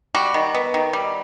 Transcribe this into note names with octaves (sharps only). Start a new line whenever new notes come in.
G3 F#4
D#3
B3
D#3
G3